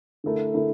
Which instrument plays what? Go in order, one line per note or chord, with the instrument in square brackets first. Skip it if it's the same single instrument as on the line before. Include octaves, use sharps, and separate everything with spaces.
[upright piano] D3 A3 E4 A#4
D3 A3 E4 A#4